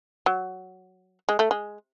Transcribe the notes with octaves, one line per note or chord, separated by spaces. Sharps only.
F#3
G#3
A3
G#3